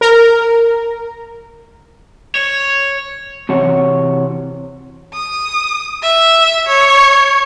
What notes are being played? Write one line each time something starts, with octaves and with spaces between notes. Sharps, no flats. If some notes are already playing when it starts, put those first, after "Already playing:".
A#4
C#5
C3 E3 F#4 C#5 F#5
D#6
E5
C#5